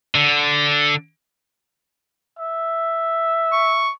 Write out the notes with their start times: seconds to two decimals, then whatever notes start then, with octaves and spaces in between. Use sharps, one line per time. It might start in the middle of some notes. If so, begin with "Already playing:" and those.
0.15 D3
2.39 E5
3.52 C#6